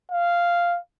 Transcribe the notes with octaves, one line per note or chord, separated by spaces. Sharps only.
F5